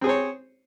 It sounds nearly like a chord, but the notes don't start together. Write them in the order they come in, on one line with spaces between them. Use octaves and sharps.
C4 G#4 C5 C#5